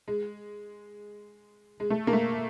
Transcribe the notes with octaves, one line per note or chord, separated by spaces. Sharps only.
G#3
G#3
A3
A#3
A3